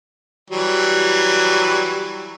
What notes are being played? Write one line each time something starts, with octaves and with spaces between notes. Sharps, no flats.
E3 F#3 G3